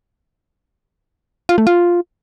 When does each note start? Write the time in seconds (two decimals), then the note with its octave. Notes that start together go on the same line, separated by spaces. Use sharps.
1.49 F4
1.58 A3
1.67 F4